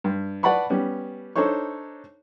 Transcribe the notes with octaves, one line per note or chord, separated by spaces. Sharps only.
G2
B4 D5 F#5 A5 B5 C#6
G3 B3 C#4
D4 D#4 A4 C5 C#5 C#6